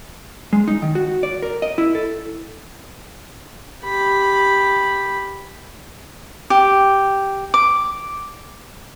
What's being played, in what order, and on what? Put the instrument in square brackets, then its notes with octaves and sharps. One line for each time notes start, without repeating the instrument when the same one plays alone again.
[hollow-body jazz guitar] G#3
D#4
D#3
F#4
D5
A#4
D#5
E4
A4
[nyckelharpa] G4 B5
[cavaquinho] G4
D6